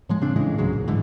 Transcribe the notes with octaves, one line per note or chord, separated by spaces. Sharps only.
A2 F3 G#3
C#3 C4 D4
A2 C#3 E3 G#3
C#2 G#2 F#3 G#3
A#1
G#2 D3 E3